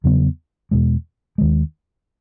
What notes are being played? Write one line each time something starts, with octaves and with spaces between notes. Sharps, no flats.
E2 C#3 F#3 B3
E2 B2 G#3
D#2 D#3 G#3